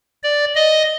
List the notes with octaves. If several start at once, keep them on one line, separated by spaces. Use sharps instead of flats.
D5
D#5